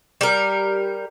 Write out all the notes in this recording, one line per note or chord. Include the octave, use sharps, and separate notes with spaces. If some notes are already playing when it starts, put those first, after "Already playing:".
G3 A#4